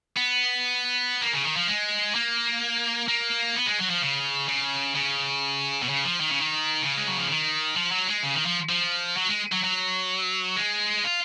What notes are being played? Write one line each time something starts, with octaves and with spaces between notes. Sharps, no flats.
B3
A#3
C#3
D#3
F3
G#3
A#3
A#3
B3
G#3
F#3
F3
C#3
C#3
C#3
B2
C#3
F3
D#3
C#3
D#3
C#3
G#3
F#3
F3
D#3
F3
F#3
G#3
C#3
D#3
F3
F3
F#3
G#3
F#3
F#3
G#3
F4